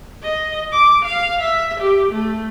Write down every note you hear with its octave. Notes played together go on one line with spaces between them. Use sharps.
D#5
D6
F5
E5
G4
A3